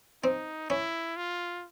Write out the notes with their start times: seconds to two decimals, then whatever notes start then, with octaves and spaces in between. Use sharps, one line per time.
0.23 C4 D#4
0.70 C#4 E4
1.17 F4